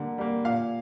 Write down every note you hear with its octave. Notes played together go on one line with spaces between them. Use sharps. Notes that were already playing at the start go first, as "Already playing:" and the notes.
Already playing: D3 G3 A#3
G3 A#3
A#2 F5